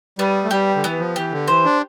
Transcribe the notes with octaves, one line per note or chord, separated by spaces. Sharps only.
G3 B3
A3
G3 G4
D3
E3 B3
F3
E3 G4
D3
E3 C5
D4